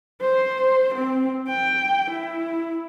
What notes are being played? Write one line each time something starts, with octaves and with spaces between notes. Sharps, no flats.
C5
C4
G5
E4